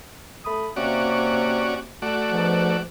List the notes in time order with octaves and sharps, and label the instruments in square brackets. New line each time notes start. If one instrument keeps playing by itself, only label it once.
[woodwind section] A3 B5 D#6
[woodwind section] C3 A#3 [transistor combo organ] C#4 F#4 D5
[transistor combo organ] A3 F#4 D5
[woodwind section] G#2 B2 F3